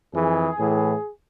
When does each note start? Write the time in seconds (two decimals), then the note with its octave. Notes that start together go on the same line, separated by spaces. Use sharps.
0.14 F2 E3 G#4
0.58 A2 E3